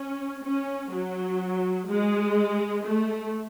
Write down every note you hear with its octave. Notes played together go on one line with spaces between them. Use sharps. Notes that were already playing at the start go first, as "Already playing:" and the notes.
Already playing: C#4
C#4
F#3
G#3
A3